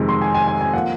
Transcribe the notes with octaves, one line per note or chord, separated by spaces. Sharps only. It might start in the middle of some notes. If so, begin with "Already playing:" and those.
Already playing: F2 C3 D#3 G#3
C6
G#5
G#5
G#5
G#5
F3 A#3 F#5